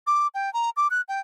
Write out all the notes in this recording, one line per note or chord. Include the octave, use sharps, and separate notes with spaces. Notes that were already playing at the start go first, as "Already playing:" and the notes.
D6
G5
A#5
D6
F#6
G5